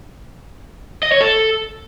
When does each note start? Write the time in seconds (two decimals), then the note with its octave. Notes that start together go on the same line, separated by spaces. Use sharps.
1.03 D#5
1.12 C#5
1.21 A4